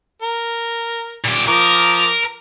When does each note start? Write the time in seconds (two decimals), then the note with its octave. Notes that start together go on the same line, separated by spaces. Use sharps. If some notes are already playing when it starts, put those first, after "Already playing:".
0.22 A#4
1.25 A#2 G4
1.48 F3 A#4 D6 D#6